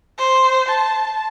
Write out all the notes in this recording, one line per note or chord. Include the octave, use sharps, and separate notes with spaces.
C5
A5